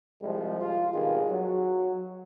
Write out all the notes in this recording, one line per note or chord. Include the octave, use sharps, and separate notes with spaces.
C2 F3 G3 G#3
F4
G#1 G2 B2 D#3 G4 G#4
F#3